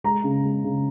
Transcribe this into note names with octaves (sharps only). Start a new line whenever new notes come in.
G#3 A#5
C#3
G#3
C#3